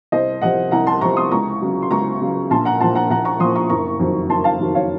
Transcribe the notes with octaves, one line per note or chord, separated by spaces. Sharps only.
C2 C5 D#5
C3 F3 D#5 F#5
C2 F#5 A#5
A5 C6
C3 F3 A#5 C#6
C6 D#6
C#2 A#5 C#6
C#3 F#3
C6
C#2 A#5 C#6
C#3 F#3
A#1 A5 C6
F#5 A#5
A#2 F3 A5 C6
F#5 A#5
A#1 F#5 A#5
A#5 C#6
A#2 F3 C6 D#6
A#5 C#6
F#1 A#5 C#6
F2 D#3 F#3
F#1 A5 C6
F5 A5
F2 D#3 F#3
C#5 F5